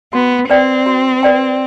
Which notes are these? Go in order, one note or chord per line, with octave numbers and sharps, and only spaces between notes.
B3 F#4
C4 B4 D5 G5
F#4
B4 D5 G5